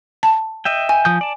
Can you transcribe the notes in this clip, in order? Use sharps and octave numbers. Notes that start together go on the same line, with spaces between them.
A5
D#5 E5 G5
G#5
F3 D#6 G6
D5 A5